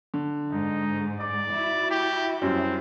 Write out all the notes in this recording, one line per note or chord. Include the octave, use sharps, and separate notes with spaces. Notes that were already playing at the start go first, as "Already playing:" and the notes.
D3
G#2 D#4
D5 D6
E4 F#4
G4
F#2 G3 C4